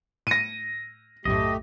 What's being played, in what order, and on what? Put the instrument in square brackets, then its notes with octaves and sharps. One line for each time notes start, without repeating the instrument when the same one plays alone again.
[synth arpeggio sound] A2 C#7 [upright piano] A#6 D#7
[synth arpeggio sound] B1 F#2 A2 [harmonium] A3 G4 [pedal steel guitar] D#5